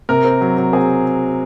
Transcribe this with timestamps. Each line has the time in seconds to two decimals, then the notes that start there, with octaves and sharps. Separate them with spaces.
0.09 C3 A#4
0.25 C4
0.41 F#3
0.57 F#3
0.73 C4 G#4